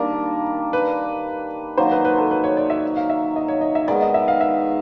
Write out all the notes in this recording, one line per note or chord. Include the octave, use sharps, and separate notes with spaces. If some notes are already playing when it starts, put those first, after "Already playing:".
Already playing: D#3 G3 A#3 D4 A#4
B4
D#3 F#3 A#3 D#4 C5
B4
B4
A4
B4
C#5
D5
E5
F5
E5
D#5
C#5
D#5
E5
D#3 G#3 B3 D5
D#5
E5
F5
E5